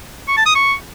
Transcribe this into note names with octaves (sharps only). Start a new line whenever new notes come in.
C#6
A5
D#6
C#6